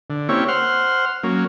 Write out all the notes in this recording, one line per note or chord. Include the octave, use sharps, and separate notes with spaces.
D3
A#3 C4 C#4 E4 G4 C#5
C5 F#5 C6 F6
F#3 A#3 C#4